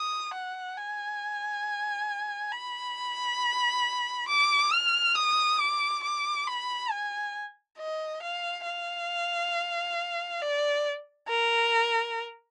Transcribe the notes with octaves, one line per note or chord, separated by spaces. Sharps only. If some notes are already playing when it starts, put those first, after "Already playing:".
Already playing: D#6
F#5
G#5
B5
D6
F6
D#6
D6
D6
B5
G#5
D#5
F5
F5
D5
A#4